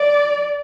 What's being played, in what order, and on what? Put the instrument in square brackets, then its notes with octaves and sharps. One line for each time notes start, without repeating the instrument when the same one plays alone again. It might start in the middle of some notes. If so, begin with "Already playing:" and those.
Already playing: [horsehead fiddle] D5